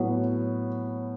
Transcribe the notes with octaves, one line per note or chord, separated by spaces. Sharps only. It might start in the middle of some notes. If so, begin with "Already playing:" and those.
Already playing: A2 F#3 B3